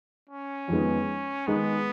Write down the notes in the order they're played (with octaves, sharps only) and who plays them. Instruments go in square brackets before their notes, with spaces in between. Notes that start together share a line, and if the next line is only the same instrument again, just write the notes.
[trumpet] C#4
[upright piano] F2 D#3 G#3 B3
[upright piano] D#3 G#3 D#4 [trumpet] B3